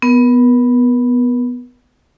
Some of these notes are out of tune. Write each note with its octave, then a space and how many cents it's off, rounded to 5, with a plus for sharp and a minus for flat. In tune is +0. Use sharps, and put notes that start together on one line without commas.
B3 +0 A#4 +35